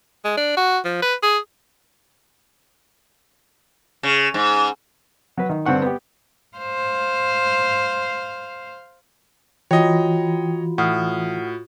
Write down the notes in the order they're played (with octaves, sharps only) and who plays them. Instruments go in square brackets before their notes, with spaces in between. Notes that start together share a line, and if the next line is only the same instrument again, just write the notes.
[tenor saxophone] G#3
D4
F#4
F3
B4
G#4
[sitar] C#3
G#2
[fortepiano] F#3 B4
D#3
G2 D3 C4 F#5 C#6
B3 G4
[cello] C5 F5
[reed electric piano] E3 [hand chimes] F4 F#4 [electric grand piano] C#5 D#5 [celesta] G5
[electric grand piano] A2 [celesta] F#5 D#6 F6